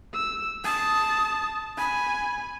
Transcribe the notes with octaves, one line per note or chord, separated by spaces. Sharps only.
E6
A5 D#6
G#5 B5